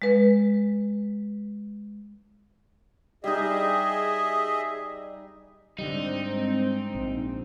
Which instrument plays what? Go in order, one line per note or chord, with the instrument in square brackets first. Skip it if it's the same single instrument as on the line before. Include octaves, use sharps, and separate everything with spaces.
[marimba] G#3 B4
[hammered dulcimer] G3 D#4 [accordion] G#4 D#5 E5
[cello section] G#2 C4 [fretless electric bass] D3 G3 [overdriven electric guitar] D#4
[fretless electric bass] A#1